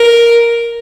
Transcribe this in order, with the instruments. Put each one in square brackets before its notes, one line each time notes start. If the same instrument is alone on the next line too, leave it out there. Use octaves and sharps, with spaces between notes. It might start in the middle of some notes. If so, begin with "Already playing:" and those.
Already playing: [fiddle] A#4